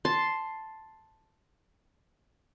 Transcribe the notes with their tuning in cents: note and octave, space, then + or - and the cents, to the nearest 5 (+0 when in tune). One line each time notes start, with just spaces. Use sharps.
A5 +0 C6 +0